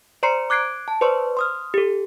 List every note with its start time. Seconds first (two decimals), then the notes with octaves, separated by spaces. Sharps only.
0.23 C5 D5 A#5 C6 C7 C#7
0.50 D6 F#6 G#6 C7 D7
0.88 A5
1.01 B4 C5 D5 C6 C#6
1.37 C6 D#6 F6
1.74 G4 A4